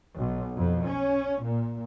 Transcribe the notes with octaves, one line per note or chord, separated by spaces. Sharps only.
B1
F2
C#4
A#2